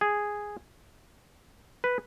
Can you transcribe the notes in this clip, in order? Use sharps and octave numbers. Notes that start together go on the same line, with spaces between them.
G#4
B4